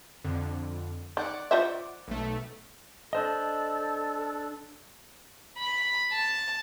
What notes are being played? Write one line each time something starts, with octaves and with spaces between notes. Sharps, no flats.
F2 D3
D#3 D5 F#5 D6
F4 C5 E5
B1 A3
D4 A4 C5 D#5
B5
A5